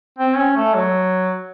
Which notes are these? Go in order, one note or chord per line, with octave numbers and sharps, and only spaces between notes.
C4
C#4
A3
F#3